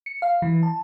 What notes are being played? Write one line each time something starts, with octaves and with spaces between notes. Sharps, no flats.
C#7
F5
E3
A5